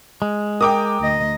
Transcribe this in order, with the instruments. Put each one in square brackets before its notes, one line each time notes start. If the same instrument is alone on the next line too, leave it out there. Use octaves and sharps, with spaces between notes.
[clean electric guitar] G#3
[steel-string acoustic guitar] A#4 [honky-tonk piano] G5 D6 D#6
[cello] D2 D#5